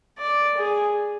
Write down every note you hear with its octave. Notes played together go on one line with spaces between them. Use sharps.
D5
G#4